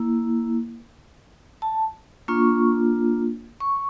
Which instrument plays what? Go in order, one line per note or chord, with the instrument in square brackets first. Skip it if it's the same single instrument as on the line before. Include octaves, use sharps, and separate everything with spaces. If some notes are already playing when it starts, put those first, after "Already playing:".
Already playing: [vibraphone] A#3 E4
A5
A#3 D4 F4 C#6
C#6